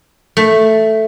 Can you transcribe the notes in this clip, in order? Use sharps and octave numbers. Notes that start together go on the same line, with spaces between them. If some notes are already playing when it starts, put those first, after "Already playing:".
A3